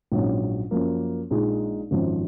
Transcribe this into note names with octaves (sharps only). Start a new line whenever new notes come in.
A#1 G#2 F#3 C#4
F#2 F3 A#3
A#1 A#2 G#3 D#4
G#1 F#2 F3